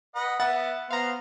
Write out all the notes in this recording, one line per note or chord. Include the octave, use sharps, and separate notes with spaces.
B4 D#5 F#5
B3 E5 F#5 A6
B3 C5 F5 A#5